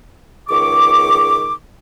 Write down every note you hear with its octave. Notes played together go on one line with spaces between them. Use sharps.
C#2 D#3 G#4 C#6 D6